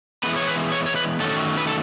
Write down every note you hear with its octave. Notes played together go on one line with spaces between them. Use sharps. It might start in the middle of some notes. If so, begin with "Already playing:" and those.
E3 G#3 B3 B4
C#5
B4
C#5
C#5
B4
D#3 F#3 A3 C#4 A4
B4
A4